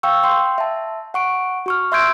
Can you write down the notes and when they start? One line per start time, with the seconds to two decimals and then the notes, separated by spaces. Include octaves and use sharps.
0.03 F5 G5 C#6 E6
0.23 G5 C6
0.58 E5 A5
1.14 F#5 C#6 D7
1.66 F#4 C#6 F6
1.92 E5 C6 E6 G6 G#6 D7